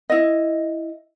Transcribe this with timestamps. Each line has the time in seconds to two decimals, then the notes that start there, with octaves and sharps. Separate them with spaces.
0.10 E4 D#5